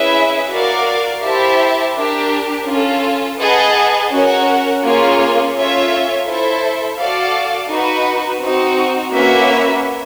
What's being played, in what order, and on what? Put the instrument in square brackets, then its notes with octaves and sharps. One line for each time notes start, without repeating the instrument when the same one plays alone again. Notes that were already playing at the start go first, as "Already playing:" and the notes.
Already playing: [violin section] C#4 E4 G#4 B4 E5
F#4 A#4 D5 F5
E4 G4 C5 E5 A5
D4 G4 A#4
C#4 F4 A4
G#4 B4 D#5 F#5 A5
C#4 F#4 A#4 C#5 F#5
A#3 C#4 F4 G#4 C#5
C#4 F4 A4 C#5 E5
E4 A4 C5 E5
F#4 A4 D5 F5
D#4 F#4 B4
C4 D#4 F#4
A#3 C#4 F#4 B4 E5